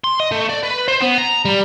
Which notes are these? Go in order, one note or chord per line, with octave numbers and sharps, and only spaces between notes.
C6
D#5
A3
D5
B4
C5
B3
A#5
G3